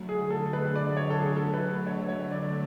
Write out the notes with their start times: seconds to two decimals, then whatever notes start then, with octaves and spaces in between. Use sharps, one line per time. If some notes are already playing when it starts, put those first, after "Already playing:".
Already playing: D3 F#3 A3
0.09 G#4
0.30 A4
0.53 B4
0.76 D5
0.97 C#5
1.10 A4
1.20 G#4
1.37 A4
1.54 B4
1.87 C#5
2.08 C#5
2.31 D5